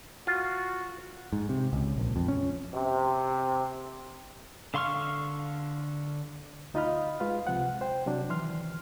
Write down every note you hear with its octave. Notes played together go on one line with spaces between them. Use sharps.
F4 F#4
G#2
C3
C#2
A#1
F2
C#4
C3
D3 F5 C6 C#6 F6
D2 D#4 F4 D#5 B5 F6
G#3 F4 B4 F5
C#2 C3 F3 F#5
C5 G5
C3 F#3 D4
D#3 E3 C6 F6